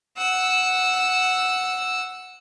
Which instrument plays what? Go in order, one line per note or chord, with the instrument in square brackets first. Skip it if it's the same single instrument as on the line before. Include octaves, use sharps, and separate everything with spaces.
[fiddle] F#5 E6